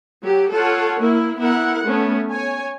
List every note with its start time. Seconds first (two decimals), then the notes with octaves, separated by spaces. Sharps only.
0.22 F#3 G4
0.51 F4 A4 C#5 F#5
1.00 A#3 E4
1.38 B3 E4 A#4 F#5
1.85 A3 B3 C#4
2.31 C#5 G#5